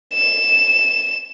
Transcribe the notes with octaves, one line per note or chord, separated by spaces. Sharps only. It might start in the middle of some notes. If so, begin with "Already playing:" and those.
E7